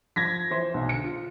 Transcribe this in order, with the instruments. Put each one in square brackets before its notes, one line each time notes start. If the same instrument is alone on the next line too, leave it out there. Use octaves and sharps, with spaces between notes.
[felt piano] F3 [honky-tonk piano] G#6 A#6 B6
[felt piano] E3 C5 C6
B1
D3 C#7
F4